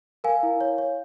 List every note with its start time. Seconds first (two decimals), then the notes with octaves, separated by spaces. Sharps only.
0.24 A#4 F5 G#5
0.43 E4
0.61 C#5
0.78 C#5